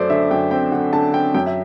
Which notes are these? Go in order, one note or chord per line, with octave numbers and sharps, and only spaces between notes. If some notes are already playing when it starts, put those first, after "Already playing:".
Already playing: F#2 A3 C5 D5
D3 E5
F#2 G5
C4 G5
D3 F#5
D3 A5
C4 G5
F#2 G5
E5